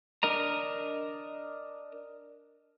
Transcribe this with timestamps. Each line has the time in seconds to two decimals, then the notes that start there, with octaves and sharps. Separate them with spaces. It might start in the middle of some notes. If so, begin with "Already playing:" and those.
0.23 D4 A#4 D#5 A#5